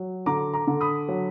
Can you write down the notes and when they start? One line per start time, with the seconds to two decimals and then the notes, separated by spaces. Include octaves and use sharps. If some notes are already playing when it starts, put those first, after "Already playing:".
Already playing: F#3
0.26 D3 A#5 D6
0.53 A#5 D6
0.67 D3
0.81 B5 D#6
1.08 F#3